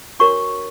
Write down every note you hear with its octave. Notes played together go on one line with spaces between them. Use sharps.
D4 F#4 A#4 C#5 C#6